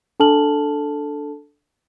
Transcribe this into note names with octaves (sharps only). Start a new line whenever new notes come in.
D4 A4 A5 F6 F#7